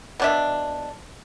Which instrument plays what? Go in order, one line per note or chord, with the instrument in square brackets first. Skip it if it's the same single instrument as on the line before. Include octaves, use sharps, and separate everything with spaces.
[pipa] B2 D4 E5